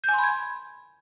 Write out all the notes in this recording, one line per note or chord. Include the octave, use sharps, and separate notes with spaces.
G#5 B5 C6 G6 G#6